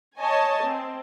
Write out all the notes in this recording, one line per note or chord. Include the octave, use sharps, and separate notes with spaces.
C#5 D#5 G#5 A5
C4